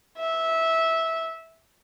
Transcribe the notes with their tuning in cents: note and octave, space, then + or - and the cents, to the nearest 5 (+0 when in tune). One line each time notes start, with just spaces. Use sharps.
E5 -15